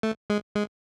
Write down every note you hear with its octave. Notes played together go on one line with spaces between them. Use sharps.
A3
G#3
G#3